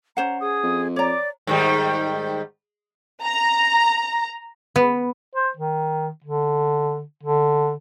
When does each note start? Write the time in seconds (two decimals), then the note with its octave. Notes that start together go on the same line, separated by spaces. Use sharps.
0.17 C#4 C5 F#5 A#5
0.41 G#4 D#6
0.63 F2
0.96 C#5 D5 A#5 D6
1.47 G#2 D#3 G3
3.23 A#5
4.76 B3
5.35 C5
5.57 D#3
6.24 D3
7.23 D3